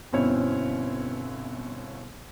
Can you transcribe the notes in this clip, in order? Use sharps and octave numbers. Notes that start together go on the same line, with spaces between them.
G1 B2 C4 C#4 E4 C#5